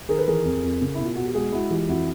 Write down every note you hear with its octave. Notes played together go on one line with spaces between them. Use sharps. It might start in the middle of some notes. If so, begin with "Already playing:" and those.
D#3 G#4 A#4
A4 B4
E3 G#4 A#4
F2
F2
C#3
B2 E4
F4
B2 F#4
G4
G#3 F#4 G#4
G#3 E4 F#4
E3 F4 G4
F2 E4 F#4